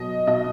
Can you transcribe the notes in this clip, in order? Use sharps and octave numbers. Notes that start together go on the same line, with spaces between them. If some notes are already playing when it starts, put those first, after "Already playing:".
Already playing: B2 F#3 D#5
B2 D#5